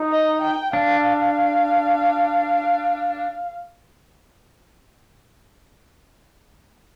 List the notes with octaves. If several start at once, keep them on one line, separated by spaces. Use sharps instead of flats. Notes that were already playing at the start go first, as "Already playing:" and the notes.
Already playing: D#4
D#5
G5
D4 F5